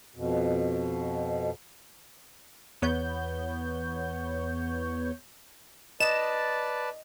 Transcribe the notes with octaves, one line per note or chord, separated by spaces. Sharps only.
F2 B2
E2 B3 C#5 G6
B4 D5 D#5 A5 E7